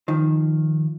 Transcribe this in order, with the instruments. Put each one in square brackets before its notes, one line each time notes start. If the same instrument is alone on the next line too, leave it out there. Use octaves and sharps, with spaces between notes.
[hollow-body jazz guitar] D#3 F3